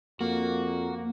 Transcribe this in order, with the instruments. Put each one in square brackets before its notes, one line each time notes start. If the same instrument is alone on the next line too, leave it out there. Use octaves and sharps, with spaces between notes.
[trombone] F2 [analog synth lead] A#3 [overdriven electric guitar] F#4